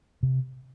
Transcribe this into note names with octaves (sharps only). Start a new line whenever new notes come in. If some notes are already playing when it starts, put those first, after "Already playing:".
C3